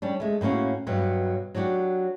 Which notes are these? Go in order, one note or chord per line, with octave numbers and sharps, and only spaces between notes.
G3 C#4 D4
G#3 A3
A2 A#3 B3 C#4 F#4
G2 B2 F#3
F#3 D4 F#4 G4